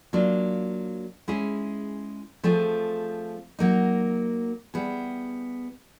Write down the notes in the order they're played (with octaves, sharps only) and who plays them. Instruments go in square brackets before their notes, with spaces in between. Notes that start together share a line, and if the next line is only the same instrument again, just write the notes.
[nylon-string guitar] F#3 A#3 D4 F4
G#3 C#4 E4 G#4
F3 A3 C4 F4 G#4
F#3 A#3 D#4
G3 B3 E4 G#4